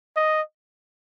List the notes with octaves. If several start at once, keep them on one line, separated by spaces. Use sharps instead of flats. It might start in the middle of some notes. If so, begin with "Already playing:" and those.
D#5